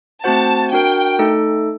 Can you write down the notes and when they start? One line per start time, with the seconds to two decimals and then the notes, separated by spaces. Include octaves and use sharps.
0.24 A3 C4 F#4 C5 F#5 A5
0.72 D4 F#4 A#4 G5
1.19 A3 D#4 A4